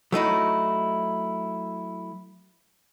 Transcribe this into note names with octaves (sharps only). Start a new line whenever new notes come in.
F#3 A3 D#4 E4